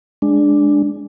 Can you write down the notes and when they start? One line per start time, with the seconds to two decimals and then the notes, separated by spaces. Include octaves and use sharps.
0.22 G#3 D4